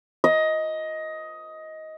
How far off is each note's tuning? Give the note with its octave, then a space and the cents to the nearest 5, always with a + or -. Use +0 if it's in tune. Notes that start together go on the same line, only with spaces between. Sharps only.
D#5 +15